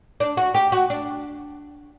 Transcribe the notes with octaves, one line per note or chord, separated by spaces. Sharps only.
D4
F#4
G4
F#4
D4